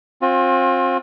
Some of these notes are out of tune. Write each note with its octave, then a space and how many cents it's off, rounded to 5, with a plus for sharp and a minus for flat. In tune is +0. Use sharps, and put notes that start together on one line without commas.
C4 +30 F4 +40